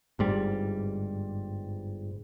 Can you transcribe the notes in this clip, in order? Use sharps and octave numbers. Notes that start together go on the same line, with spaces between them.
G1 G#2 G3